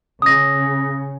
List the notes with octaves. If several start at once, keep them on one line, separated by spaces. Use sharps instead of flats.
C#3 D#6 A#6